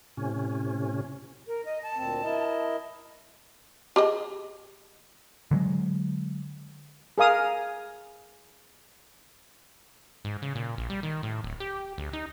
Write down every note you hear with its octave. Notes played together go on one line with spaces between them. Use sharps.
A2 C3 C#4
A#4
D#5
A5
D2 A#2 C4
E4 A#4 D#5
G4 G#4 D#5
D3 F#3 G#3
G#4 A#4 F5 D#6
G#2
C#3
A#2
A#1
G3
D#3
A2
D1
G4
D2
D#4